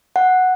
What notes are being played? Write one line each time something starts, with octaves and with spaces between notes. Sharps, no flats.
F#5